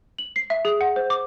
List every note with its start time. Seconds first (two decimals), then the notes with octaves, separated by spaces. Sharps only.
0.18 F#7
0.36 C7
0.50 E5
0.65 G#4
0.81 F#5
0.96 C5
1.10 D6